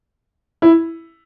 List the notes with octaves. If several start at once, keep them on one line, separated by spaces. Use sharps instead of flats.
E4